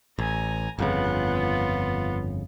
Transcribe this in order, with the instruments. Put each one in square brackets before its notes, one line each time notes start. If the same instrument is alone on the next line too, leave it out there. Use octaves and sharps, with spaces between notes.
[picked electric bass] A1 [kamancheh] G#5 A#5
[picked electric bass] G1 F2 C#3 [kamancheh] B3 F4